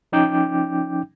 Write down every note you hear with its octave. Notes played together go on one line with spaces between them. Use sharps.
F3 C#4 D#4 G5 D6 G6